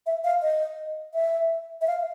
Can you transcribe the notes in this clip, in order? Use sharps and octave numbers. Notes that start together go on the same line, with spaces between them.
E5
F5
D#5
E5
E5
F5